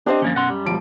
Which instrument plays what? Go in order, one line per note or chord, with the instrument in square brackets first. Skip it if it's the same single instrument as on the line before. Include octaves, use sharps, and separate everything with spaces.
[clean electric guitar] C4 G4 [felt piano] D4 C5 D#5
[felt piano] F#2 [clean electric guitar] F3 A#3 C#4
[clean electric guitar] B2 F#5 C6
G3
[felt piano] E1 F3 D7